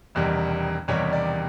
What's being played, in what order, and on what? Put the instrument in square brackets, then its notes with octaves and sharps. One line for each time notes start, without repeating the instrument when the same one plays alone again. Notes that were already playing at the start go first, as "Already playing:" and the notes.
[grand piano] E1 E2 C3 D#3 G3
E1 E2 C3 D#3 G3 C#5
D5